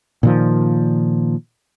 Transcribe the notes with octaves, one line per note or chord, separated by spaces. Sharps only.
A#2 D#3 F3